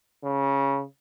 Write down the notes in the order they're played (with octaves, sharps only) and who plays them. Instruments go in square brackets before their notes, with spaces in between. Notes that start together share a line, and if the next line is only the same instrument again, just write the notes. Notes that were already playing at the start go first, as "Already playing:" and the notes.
[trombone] C#3